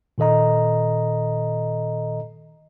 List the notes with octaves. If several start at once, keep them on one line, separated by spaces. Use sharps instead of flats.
A#2 D#3 A4 D#5 A#5